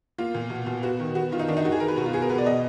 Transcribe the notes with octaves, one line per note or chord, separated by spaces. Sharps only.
A#3 F4
A#2
B2
B2
B3 F#4
D#3
B3 F#4
D#3 F4
D#4
D#3 D4
D#4
D#3 F#4
G#4
B3 A#4
B4
B2 F#4
F4
B3 G#4
A#4
B2 B4
D5
B2 D#5